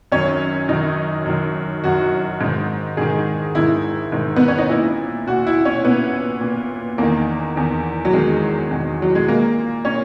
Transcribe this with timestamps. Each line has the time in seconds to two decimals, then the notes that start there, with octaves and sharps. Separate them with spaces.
0.12 F#2 D#3 C#4
0.68 F#2 D#3 D#4
1.26 F#2 D#3
1.83 F#2 D#3 F#4
2.41 G#2 D#3
2.97 G#2 D#3 G#4
3.54 G#2 D#3 E4
4.12 G#2 D#3
4.36 B3
4.48 C#4
4.58 D#4
4.69 A#2 E4
5.27 A#2 F#4
5.47 E4
5.65 C#4
5.85 A#2 B3
6.41 A#2
6.98 E2 D#3 A#3
7.56 E2 D#3
8.05 F#3
8.13 E2 D#3 G#3
8.71 E2 D#3
9.02 F#3
9.15 G#3
9.28 A#2 A#3
9.85 A#2 C#4